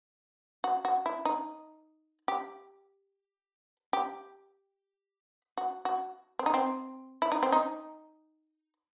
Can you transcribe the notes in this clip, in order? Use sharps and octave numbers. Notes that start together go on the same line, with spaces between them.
F#4
F#4
E4
D#4
G4
G4
F#4
F#4
C4
D#4
C4
E4
D#4
C4
D#4